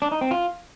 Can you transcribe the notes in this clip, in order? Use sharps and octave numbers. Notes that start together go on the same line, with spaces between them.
D4
D#4
C4
F4